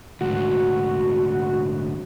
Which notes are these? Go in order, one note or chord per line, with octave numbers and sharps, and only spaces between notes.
D2 G#2 F#4